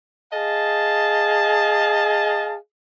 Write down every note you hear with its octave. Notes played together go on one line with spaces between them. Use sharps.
G#4 D#5 F5 A5